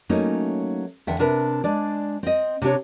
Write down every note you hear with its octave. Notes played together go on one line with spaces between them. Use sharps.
F#3 A3 A#3 C#4 D#4
E2 D3 E5 F#5 G5
C3 D4 A#4 B4
G#3 D4 D5
C4 D#5
C3 D4 G4 C#5